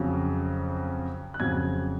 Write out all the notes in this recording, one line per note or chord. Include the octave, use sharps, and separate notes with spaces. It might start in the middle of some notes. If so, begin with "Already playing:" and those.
Already playing: F2 C#3 F#3
F#6
F2 C#3 F#3 G#6